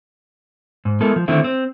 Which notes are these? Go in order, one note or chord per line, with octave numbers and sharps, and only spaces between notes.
G#2
G#3 B3 E4 A4 A#4
F3
D3 D#3 A3 C4 E4
C4